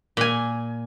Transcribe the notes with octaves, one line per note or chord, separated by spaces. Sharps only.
A#2 G#5